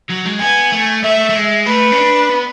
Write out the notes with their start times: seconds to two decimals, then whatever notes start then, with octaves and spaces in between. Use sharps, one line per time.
0.09 F#3
0.25 G#3
0.40 B3 G#5
0.72 A3
1.03 A3 E5
1.30 A3
1.35 G#3
1.66 A3 B4
1.92 C#4
1.98 D4
2.29 B3